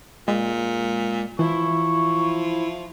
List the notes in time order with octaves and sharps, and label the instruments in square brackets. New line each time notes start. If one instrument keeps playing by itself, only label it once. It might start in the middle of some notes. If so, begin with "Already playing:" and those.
[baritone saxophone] A#2 [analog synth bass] G#3
[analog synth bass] E3 [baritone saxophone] F3 [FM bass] E4 [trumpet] C#6